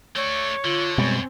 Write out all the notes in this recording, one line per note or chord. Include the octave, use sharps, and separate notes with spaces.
A3 C#5 D5
D3 F4
F#2 B2 G3 G#3 C4